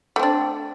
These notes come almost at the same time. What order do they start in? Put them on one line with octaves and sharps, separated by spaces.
A3 C4 D4